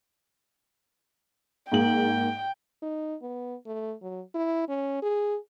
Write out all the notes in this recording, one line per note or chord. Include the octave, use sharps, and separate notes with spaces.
G#2 G#3 A#3 G5 F#7
D#4
B3
A3
F#3
E4
C#4
G#4